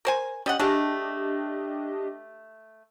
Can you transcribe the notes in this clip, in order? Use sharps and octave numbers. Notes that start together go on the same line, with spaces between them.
A#4 C5 G#5
G3 C#4 D#5 F#5
G#3 A3 D4 G4 D#5